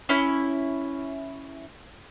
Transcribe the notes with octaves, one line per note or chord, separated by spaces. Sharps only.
C#4 E4